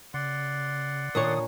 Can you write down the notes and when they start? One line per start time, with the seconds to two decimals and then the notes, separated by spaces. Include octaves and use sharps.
0.14 C#3 D5 F#5 C6
1.15 A#2 D#3 D4 C#5 D#6